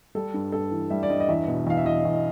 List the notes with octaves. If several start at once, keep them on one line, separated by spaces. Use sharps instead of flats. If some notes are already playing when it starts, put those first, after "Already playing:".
G3 A4
G2
G2 A4
E3
G3 E5
D5
G2 D#5
D#5
E2 E5
B2
E2 F5
E5
E2 D#5
E2